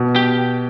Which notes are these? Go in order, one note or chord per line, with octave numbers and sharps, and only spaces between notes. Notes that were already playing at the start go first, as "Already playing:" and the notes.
Already playing: B2
G4